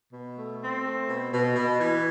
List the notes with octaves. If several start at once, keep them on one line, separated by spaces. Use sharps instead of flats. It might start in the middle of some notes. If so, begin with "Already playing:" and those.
B2
A3
C4
A3
B2
B2
B2
E3